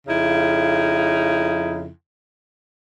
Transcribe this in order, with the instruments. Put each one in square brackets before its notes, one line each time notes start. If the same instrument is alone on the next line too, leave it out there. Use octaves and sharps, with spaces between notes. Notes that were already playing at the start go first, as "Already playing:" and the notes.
[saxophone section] F2 C#3 D#4 E4